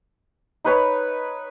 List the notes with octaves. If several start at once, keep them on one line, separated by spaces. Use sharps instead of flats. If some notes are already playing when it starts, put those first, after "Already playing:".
D#4 B4 C#5 B5